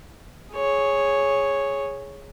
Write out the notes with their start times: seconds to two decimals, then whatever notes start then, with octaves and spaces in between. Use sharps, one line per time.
0.54 G#4 C#5